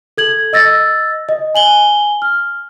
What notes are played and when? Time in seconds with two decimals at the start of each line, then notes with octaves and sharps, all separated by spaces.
0.18 A4 G#6 F#7
0.53 D#5 E6 A6 A#6
1.29 D#5
1.55 G#5 F#7 G7
2.22 F6